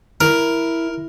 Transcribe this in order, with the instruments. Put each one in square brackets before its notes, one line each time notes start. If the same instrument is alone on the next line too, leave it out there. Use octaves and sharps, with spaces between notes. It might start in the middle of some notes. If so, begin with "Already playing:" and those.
[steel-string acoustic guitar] E4 [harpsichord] A#4